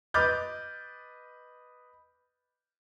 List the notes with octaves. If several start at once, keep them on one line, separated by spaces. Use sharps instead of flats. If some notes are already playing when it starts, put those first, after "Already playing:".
B4 D#5 D6 F6 G6 A6